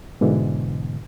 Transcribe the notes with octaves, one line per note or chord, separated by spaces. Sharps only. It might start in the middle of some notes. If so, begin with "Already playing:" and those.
G#2 B2 D3 E3